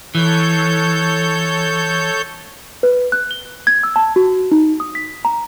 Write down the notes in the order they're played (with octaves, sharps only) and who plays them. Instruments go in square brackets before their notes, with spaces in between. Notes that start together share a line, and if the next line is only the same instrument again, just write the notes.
[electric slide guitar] E3 [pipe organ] A4 C#5 G6
[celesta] B4
F#6
G7
G#6
E6
A5
F#4
D#4
D#6
B6
A#5